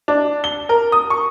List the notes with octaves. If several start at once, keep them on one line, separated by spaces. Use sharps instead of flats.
D4
G7
A#4
D#6
C#6